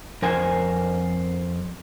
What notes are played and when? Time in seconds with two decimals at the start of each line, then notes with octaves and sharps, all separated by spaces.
0.22 F2 A#4 C5 G#5